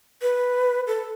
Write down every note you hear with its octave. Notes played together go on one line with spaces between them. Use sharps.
B4
A4